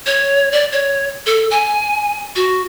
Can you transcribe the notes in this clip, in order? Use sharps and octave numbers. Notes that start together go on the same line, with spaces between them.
C#5
D5
C#5
A4
G#5
F#4